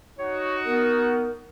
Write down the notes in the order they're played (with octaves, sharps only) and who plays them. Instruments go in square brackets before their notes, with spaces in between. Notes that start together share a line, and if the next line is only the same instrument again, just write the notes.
[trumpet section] D#4 F#4 [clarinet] C#5
[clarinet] B3 [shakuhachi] A#4